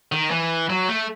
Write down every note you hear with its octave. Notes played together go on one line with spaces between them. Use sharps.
D#3
E3
F#3
A3